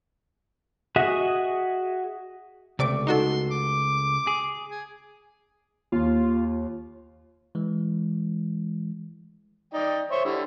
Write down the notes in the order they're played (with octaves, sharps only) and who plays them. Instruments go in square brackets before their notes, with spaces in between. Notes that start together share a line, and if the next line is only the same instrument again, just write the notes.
[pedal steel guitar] F#4 G#4 D#5 E5 F#5
[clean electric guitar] C#2 A3 [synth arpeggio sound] C3 D5 D6
[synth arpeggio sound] D#4 F#4 A4 [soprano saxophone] C6
[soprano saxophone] D6
[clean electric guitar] G#4
[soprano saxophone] G#4
[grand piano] D#2 [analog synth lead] F4
[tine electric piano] E3 G#3
[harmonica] D#4 D5 G5
C5 C#5 E5
D3 G3 E4